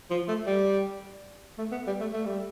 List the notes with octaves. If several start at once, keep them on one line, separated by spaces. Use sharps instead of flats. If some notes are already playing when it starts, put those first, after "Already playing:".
F3
A3
G3
A3
B3
G3
A3
A3
G3